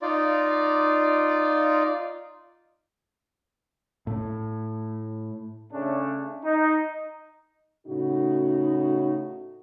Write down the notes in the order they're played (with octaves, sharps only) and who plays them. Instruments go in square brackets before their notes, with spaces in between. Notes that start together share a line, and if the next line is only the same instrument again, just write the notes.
[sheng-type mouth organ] D#4 F4 D5
[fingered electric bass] A2
[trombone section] C#3 A3 C#4 D4
D#4
[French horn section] A2 C#3 D#4 F#4